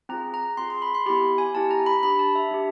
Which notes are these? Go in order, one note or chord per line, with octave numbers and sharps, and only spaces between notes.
C4 F4 G#4 A#5
A#5
C4 F4 G#4 C6
C6
B5
C6
B3 E4 G4 B5
G#5
B3 E4 G4 A5
A#5
B5
D4 G4 B5
A5
E5
D4 G4